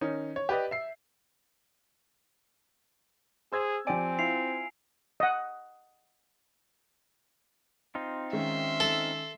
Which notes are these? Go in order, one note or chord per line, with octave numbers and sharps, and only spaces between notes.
D#3 C#4 D#4
C#5
G4 B4 D5 D#5
E5 C7
G#4 C5 E6 G#6
F3 C4 G4 D5 G#5 D7
E4 F4 C7 F7
D#5 F#5
C4 D#4 F4
D#3 G#3 C#4 E5 C6
A4